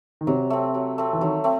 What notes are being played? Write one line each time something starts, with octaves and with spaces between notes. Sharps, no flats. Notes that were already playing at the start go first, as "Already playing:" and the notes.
D#3
C3 F#3
A3 C4
F#3
A3 C4
E3
D#3 F#3
A3 C4